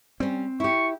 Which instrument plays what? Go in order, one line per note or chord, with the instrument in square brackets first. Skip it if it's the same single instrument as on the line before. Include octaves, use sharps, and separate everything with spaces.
[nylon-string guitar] G3 C#4 [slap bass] C4
[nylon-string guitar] E4 G4 [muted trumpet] C#6